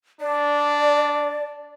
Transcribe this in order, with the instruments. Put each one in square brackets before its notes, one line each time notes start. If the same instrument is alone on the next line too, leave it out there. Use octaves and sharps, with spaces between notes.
[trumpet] D4 [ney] D5